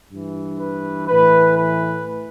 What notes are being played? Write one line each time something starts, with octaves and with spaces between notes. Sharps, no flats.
G2 E3
B4
A2 E3 B4
B4